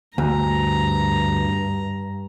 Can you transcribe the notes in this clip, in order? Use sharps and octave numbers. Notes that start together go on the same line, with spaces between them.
D2 G2 A#5